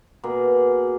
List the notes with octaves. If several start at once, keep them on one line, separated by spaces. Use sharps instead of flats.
B2 A#3 G#4